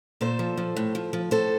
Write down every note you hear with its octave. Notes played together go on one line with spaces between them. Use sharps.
A#2 A4 C5
F3
F3
A2
F3
F3
A2 A4 C5